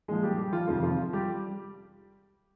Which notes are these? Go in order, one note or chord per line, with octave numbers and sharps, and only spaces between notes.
A#2 F3 G#3 G#4
G3 G4
G3 G4
F3 F4
F2 C3 D#3 F3 F4
F3 F4
G3 G4